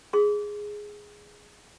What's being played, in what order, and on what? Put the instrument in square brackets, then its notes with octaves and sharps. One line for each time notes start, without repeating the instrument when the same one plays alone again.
[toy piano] G#4 C6